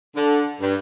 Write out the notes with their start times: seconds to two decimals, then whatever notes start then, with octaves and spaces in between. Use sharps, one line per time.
0.16 D3
0.61 G2